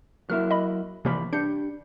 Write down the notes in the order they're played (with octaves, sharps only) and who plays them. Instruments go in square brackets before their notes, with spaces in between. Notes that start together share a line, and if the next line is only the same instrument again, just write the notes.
[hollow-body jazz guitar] F#3 A#3 E4 [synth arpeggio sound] F6
[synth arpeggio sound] D#5 B5
[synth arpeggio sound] C3 F3 [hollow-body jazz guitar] E3 A#3 B5
[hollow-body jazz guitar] D4 G4 [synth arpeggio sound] G6 C#7